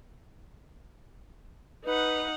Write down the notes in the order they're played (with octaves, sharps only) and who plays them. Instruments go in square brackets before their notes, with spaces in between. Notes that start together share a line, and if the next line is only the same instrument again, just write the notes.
[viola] D#4 F#5 [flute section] B4